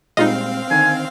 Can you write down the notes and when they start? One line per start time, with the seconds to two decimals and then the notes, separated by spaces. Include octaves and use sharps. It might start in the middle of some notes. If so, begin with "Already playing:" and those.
0.17 A#2 G3 G#3 C4 D#4 F4 D#5 F5
0.71 D3 D#3 G#5